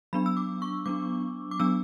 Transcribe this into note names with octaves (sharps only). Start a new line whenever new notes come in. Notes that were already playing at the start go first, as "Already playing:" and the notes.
F#3 B3 D4 B5
E6
D6
C#6
F#3 B3 D4 D6
D6
F#3 B3 D4 E6